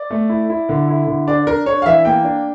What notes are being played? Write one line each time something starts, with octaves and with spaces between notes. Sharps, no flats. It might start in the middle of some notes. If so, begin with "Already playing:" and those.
Already playing: D5
A3
E4
E4
D3
E4
D3
D4 D5
D4 A#4
D4 C#5
F5
E3 E5
A#3 G5
D4